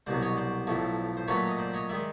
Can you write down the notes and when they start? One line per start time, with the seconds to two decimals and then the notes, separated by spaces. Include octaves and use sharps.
0.07 C2 B2 F#3 C5 D5
0.22 C#5 D#5
0.37 C5 D5
0.67 B1 A2 F3 A3
1.17 C5
1.28 A#2 F#3 A3 C#4 B4 C#5
1.47 D#5
1.59 C5 D5
1.74 C#5 D#5
1.89 D#3 G#3 D5 E5